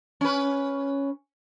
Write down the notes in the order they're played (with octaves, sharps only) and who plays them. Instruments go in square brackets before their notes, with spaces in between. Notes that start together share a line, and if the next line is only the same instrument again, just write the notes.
[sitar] C#4 B4